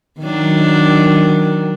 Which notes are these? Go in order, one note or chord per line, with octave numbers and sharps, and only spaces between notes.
D#3 F#3 D4